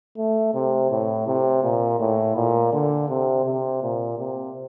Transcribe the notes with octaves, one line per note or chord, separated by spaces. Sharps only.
A3
C3
A2
C3
A#2
A2
A#2
D3
C3
C3
A#2
C3